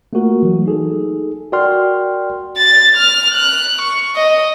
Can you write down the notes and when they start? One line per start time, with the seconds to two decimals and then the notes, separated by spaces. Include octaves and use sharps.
0.13 A3 A#3 F4 F#4 A#4
0.43 E3 F#3
0.66 D#4 G#4 A4
1.52 F#4 A#4 D5 G5 C6 F6
2.58 A6
2.97 F6
3.35 F#6
3.82 C#6
4.16 D#5